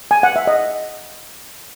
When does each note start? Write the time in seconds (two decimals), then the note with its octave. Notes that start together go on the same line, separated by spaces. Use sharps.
0.11 G#5
0.23 F#5
0.36 E5
0.47 D#5